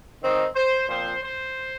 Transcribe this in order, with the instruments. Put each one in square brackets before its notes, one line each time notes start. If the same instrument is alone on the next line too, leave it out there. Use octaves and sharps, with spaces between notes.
[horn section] D#3 C4 D#4
C5
A#2 F3 C4 C5
C5